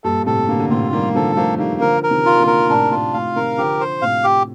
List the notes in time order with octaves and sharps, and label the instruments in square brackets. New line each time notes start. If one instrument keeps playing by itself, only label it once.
[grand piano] G2 A#2 [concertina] A4
[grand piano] A2 C3 [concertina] A4
[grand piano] A#2 D3 [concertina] A#3
[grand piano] D3
[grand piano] A2 C3 [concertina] F4
[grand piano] D#3 G3 [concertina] A#3
[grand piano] D3 F3 [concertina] A4
[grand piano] F3 A3 [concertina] A#3
[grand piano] D#3 G3 [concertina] A#3
[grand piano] D3 F3 [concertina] A#4
[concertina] A#4
[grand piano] C3 D#3
[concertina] F4
[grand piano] A#2 D3
[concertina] A#4
[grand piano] A2 C3 [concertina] D4
[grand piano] A2 [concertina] F4
[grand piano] A2 [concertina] F5
[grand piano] C3 D#3 [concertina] A#4
[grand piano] D3 F3 [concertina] G4
[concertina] C5
[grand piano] A2 C3 [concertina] F5
[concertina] G4